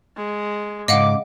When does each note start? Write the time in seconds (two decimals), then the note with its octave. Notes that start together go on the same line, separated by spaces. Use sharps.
0.16 G#3
0.88 G#2 C#3 D#5 F5 F#5 D6